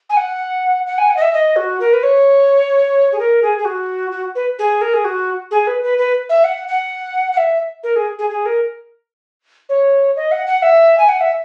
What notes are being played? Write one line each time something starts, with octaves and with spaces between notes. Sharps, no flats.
G#5
F#5
F#5
G#5
F#5
D#5
E5
D#5
F#4
A#4
B4
C#5
G#4
A#4
G#4
G#4
F#4
F#4
B4
G#4
A#4
G#4
F#4
G#4
B4
B4
B4
E5
F#5
F#5
F#5
E5
A#4
G#4
G#4
G#4
A#4
C#5
D#5
F#5
F#5
E5
G#5
F#5
E5